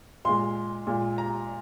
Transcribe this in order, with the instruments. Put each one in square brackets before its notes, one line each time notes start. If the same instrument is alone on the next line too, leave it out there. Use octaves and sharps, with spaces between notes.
[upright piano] A#2 G#3 C6
A#2 G#3
A#5